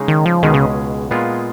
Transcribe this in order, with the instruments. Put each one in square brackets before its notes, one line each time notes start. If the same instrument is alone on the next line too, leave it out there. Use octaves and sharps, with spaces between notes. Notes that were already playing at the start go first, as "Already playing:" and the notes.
Already playing: [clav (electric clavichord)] C#3 G#3 D#4 G#4 C#5
[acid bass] D#3
F3
[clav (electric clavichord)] C#2 B2 G#3 C#4 G#4 [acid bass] D#3
[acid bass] C#3
[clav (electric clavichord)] A#2 G#3 B3 F4 G#4